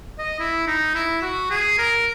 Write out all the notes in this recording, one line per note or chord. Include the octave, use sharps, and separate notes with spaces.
D#5
E4
D#4
E4
F#4
G#4
A#4